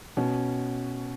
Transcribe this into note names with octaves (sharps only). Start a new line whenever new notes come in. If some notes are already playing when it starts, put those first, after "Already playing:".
B2 C#4